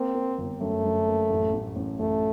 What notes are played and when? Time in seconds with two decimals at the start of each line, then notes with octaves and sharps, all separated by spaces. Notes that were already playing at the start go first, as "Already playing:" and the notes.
Already playing: A#3 C4
0.15 A#3
0.38 G1
0.61 F#2 A3
0.84 F#2
1.07 A#3
1.30 A1
1.53 A1
1.76 A1
1.99 A1 A3